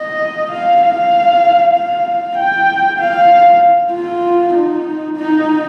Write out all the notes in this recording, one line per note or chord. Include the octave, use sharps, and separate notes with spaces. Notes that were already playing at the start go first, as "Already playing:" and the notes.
Already playing: D#5
F5
F5
F5
G5
F5
F4
D#4
D#4